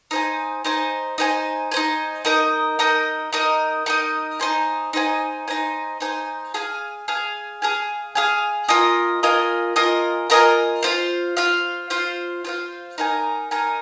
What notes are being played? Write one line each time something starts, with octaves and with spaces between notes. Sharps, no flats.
D#4 C5 G#5
D#4 C5 G#5
D#4 C5 G#5
D#4 C5 G#5
D#4 A#4 D#5
D#4 A#4 D#5
D#4 A#4 D#5
D#4 A#4 D#5
D#4 C5 G#5
D#4 C5 G#5
D#4 C5 G#5
D#4 C5 G#5
G#4 F5 G#5
G#4 F5 G#5
G#4 F5 G#5
G#4 F5 G#5
F4 A#4 D#5 G#5
F4 A#4 D#5 G#5
F4 A#4 D#5 G#5
F4 A#4 D#5 G#5
F4 C5 F5
F4 C5 F5
F4 C5 F5
F4 C5 F5
D#4 A#4 G#5
D#4 A#4 G#5